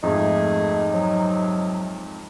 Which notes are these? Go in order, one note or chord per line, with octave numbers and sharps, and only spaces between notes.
F2 G#2 A3 D#4 G#4
C3 F3 F#3